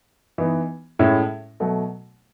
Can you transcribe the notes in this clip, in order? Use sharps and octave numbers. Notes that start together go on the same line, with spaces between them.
E3 B3 D#4
A2 G#3 C#4 E4
B2 F#3 A3